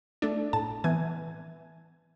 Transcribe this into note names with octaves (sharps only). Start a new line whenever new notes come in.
A3 D4
A2 A5
E3 B3 G#5